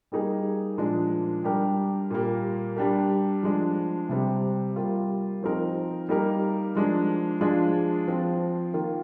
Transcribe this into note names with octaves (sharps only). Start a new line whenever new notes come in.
G3 A#3 D#4 G#4
A#2 F3 G#3 D4
G3 D4 G4 A#4
A#2 G3 A#3
G3 D4 G4 A#4
F3 G#3 D4
C3 G3 C4
G3 A#3 F4
F3 C4 D#4 A#4
G3 A#3 D#4 A#4
F3 G#3 D4
F3 G#3 D4 F4 G#4
F3 C4 F4
D#3 A#3 F4